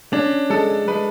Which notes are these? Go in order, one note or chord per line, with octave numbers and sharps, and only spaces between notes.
C#4 D4
G#3 A4
G#3 B4